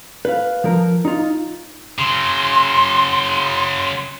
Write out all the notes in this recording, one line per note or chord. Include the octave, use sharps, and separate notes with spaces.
B4 F5
F3 A#4
D#4 F4
C#3 F#3 C6